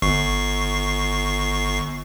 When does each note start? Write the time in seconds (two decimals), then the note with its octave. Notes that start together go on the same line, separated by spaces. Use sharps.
0.02 G1 C#6 C7